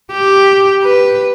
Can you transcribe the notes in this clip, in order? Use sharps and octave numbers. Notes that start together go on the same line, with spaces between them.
G4
B4